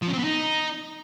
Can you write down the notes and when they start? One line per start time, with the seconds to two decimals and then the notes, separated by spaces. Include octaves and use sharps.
0.02 F3
0.08 C#4
0.13 C4
0.18 B3
0.24 D#4